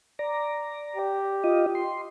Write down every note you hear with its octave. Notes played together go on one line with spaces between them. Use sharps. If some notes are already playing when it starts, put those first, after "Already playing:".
D5 A#5
G4
F4 D#5
C6